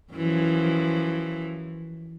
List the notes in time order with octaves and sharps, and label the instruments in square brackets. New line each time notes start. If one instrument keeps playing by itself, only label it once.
[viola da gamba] F#2 E3 F3